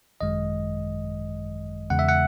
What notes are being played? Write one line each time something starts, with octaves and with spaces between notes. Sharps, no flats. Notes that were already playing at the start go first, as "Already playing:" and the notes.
G#1 F#2 D#3 G#3 D#5
E2 C#3 G#3 F#5
E5
F#5